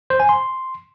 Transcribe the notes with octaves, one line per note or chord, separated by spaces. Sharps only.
C5
G#5
C6